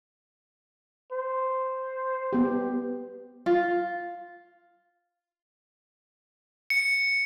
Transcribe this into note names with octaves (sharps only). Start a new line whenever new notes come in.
C5
B3 G4
F4
C#7